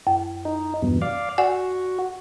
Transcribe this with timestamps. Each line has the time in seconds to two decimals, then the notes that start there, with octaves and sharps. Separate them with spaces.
0.07 F#2
0.45 D#4
0.82 E2 G2 B2
1.02 D5 F5
1.38 F#4 D5 F#5 G#5